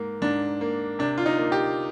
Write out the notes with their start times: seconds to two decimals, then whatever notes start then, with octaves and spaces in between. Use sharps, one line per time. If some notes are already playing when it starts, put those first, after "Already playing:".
Already playing: G#2 A#3
0.22 G#2 D4
0.61 A#3
0.99 C3 D4
1.18 F4
1.26 D#4
1.38 A#3
1.52 G4